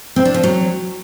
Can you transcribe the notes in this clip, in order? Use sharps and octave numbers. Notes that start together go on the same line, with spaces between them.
C4
D4
F3
F#3